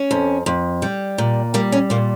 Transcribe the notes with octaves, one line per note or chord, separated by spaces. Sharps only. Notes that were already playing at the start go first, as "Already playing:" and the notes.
Already playing: C#4
F2
F2
G3
A#2
G3 A#3
C#4
A#2 A#3